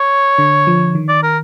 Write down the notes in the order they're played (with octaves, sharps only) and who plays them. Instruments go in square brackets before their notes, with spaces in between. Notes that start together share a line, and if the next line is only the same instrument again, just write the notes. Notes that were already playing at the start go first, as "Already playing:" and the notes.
Already playing: [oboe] C#5
[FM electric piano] D3
F3
D#3
[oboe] D5
A#4